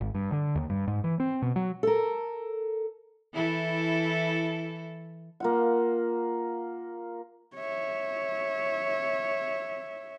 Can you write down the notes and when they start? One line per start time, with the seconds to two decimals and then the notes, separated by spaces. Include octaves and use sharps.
0.01 G#1
0.15 G2
0.32 D3
0.55 D#2
0.70 G2
0.88 G#2
1.04 E3
1.20 C4
1.42 B2
1.56 F#3
1.83 A4 A#4
3.33 E3 E4 A4
5.40 A#3 F4 F#5
7.55 C#5 E5